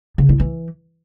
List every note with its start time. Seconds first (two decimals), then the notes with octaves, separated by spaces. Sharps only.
0.18 C#3
0.29 E4
0.40 E3